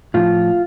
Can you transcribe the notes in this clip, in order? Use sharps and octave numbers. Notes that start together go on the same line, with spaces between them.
A2 F3 F4